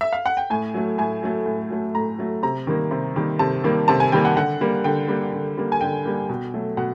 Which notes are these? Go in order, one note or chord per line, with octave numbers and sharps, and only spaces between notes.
E5
F5
F#5
G5
A2 G#5
F#3 A3
A2 G#5
F#3 A3
A2
F#3 A3
A2 A#5
F#3 A3
C3 A#5
D#3 G3 A#3
C3
D#3 G3 A#3
C3 A5
D#3 G3 A#3
C3 A5
G#5
D#3 G3 A#3 G5
F#5
D3 F#5
G3 A#3
D3 G5
G3 A#3
D3
G3 A#3
G#5
D3 G5
G3 A#3
B2
F#3 A3
B2 F#5